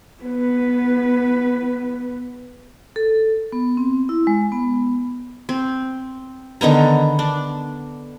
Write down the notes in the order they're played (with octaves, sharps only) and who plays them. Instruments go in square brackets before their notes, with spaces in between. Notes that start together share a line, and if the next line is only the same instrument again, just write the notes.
[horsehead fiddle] B3 B4
[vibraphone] A4
B3
C4
E4
G#3
B3
[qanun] C4
D3 D#3 B3 A#5
D4